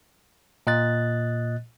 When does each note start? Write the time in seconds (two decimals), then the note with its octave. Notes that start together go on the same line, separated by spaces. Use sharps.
0.67 A#2 D#5 F#6 A6